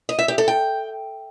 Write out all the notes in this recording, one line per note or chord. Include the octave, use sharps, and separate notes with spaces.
D#5
E5
G4
A4
G5